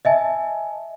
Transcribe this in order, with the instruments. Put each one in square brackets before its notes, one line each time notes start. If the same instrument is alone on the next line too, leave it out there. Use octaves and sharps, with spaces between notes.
[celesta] D#5 E5 G#5 A5